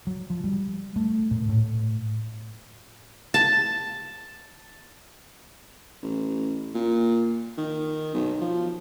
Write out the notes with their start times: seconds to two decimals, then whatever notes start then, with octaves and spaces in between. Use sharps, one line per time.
0.07 F#3
0.30 F3
0.44 G3
0.96 A3
1.31 A#2
1.49 A2
3.34 A5
6.02 A1
6.74 A#2
7.58 D#3
8.14 B1
8.41 F3